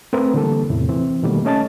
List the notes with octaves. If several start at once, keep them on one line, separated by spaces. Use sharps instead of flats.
A3 C4 A#4 B4
D3 E3 G3 A#3 A4
E2 A2 C3 E3
E3 C4
B2 D#3 G3 A3 A#3
A3 C#4 D#5 A5 A6